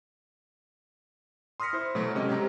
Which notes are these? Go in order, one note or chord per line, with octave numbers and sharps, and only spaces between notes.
C6 D#6 F6 A#6 B6 C#7
E4 C5
B2 F#3 A3 B3
C3 G#3 C#4 D#5
F#3 G#3 C4 G4 A#5